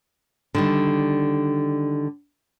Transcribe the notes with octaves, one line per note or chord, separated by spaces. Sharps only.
D3 D#3 G3